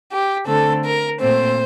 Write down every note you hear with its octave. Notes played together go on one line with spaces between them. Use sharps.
G4
D3 A3 C4 A4
A#4
A#2 A3 C4 C5